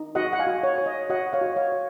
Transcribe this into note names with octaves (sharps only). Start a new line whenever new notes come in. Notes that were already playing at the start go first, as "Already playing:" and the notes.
Already playing: D#4
F#4 D#5 F#5
F#5
F5 G#5
F#4
C#5
C#5
D#5
F#4 D#5 F#5
C#5 F5
F#4
C#5 F5
C#5